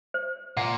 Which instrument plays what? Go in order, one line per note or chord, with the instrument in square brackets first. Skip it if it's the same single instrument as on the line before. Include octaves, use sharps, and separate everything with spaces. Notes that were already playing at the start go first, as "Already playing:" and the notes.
[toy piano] C5
[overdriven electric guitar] A#2 [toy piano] F#5